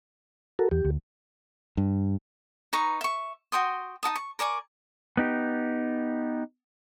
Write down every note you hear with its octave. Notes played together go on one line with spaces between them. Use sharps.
F#4 A4 A#4
E2 G4
D2
G2
D#4 B4 A#5 C#6
E5 C#6
F#4 G5 C6 D#6
D#4 F#4 A5 D#6
C#6
A#4 D5 G#5 C#6
B3 D#4 G4